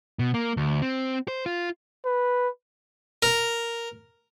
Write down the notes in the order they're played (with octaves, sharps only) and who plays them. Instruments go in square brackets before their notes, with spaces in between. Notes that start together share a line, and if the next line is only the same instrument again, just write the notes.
[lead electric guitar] B2
A#3
D2
C4
C5
F4
[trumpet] B4
[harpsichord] A#4